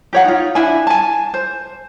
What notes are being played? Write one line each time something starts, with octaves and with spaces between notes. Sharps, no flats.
G4 C#5 F#5
D#4 F4
D4 E4 G#5
G#5 A5
C5